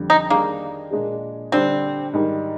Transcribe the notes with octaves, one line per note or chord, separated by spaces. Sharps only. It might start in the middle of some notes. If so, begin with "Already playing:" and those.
Already playing: F2 D3 G3
D#4
D#3 G3 A#3 D4 G#4
A#2 G#3 D4 G#4
D3 G3 C4 D4
G#2 D#3 G3